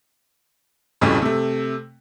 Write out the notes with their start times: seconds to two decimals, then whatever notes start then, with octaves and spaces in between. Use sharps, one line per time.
1.01 B1 F2 A2 C#3 G3
1.22 C3 A3